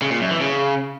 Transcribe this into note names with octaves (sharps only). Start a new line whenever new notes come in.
C#3
A#2
F#2
E3
C#3